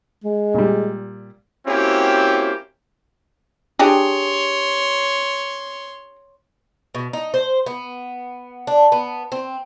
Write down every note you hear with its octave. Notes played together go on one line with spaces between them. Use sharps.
G#3
A#2 G3
A#3 C4 C#4 E4 F#4 G4
D4 G4 G#4 C#5 C6
B2
D#4
C5
B3
D4
B3
C4